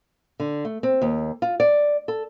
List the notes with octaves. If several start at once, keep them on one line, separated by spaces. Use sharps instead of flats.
D3
A3
C4
D#2
F4
D5
A4